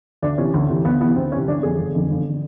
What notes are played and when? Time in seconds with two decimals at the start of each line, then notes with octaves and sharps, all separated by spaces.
0.22 D2 D4
0.38 C3 E3 C#4
0.54 D2
0.70 C3 E3
0.85 D2 B3
1.01 C3 E3 B3
1.16 D2 C4
1.32 E3 C#4
1.36 C3
1.47 G1 D4
1.63 F2 D3 G#4
1.79 G1
1.94 F2 D3
2.10 G1
2.29 D3